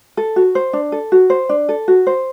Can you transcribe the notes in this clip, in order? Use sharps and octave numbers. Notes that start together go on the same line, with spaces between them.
A4
F#4
C5
D4
A4
F#4
C5
D4
A4
F#4
C5